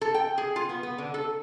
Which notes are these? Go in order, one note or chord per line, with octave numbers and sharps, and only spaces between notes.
A4
G5
G#4
F4
B3
B3
D3
A4